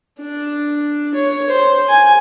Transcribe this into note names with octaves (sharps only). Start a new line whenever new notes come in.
D4
C#5
C5
G#5